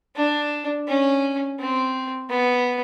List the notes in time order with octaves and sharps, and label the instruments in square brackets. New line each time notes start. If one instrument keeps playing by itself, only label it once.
[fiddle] D4
C#4
C4
B3